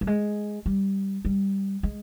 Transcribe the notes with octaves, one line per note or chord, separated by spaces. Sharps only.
G3
G#3
G3
G3
G#3